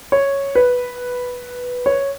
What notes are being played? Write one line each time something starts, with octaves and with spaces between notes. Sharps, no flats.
C#5
B4
C#5